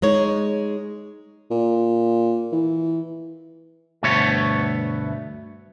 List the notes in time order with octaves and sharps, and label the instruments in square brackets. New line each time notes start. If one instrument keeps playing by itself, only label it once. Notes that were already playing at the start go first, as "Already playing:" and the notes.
[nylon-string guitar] G#3 D#4 C#5
[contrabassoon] A#2
E3
[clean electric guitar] D2 G2 B2 A3 B3 C#5